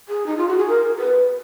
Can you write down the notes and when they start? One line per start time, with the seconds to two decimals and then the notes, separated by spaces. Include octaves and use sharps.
0.09 G#4
0.26 D#4
0.37 F4
0.48 F#4
0.58 G#4
0.69 A#4
0.99 B4